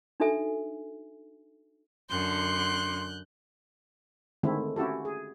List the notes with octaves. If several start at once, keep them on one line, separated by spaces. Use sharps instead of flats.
D4 D#4 F#4 A4 E5 G#5
F#2 D3 C6 F#6 G6
D3 D#3 G#3 A3 C4 E4
C#4 E4 F#4 G4 A4
G#4